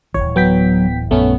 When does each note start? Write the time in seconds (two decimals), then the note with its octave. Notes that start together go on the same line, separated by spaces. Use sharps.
0.14 D1 A#1 E3 C#5
0.36 F#3 B3 G5 B6
1.11 A#1 F#2 A3 B3 C#4